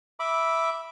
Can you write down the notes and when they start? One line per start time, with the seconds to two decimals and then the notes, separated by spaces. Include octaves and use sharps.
0.20 E5 B5 D6